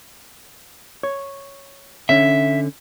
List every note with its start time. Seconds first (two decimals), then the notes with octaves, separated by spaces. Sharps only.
1.03 C#5
2.09 D3 C#4 E5